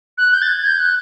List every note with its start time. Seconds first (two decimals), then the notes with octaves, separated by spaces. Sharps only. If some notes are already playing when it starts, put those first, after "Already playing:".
0.18 F#6
0.33 G6
0.42 A6
0.48 G#6
0.64 G6
0.79 F#6